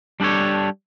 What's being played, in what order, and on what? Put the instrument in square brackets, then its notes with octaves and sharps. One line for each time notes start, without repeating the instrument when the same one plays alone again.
[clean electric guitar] G3 D4 G4 A4 C#5